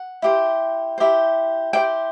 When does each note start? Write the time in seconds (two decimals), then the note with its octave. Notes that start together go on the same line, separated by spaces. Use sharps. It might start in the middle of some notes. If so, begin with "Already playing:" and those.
Already playing: F#5
0.22 E4 G4 C5
0.98 E4 G4 C5
1.73 E4 G4 C5 G5